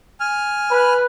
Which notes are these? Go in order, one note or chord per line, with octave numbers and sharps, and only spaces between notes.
G#5 F6
B4